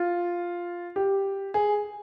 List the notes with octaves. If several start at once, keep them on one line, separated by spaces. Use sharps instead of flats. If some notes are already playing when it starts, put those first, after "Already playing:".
Already playing: F4
G4
G#4